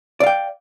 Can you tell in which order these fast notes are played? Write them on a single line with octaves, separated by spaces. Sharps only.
D5 F5 G5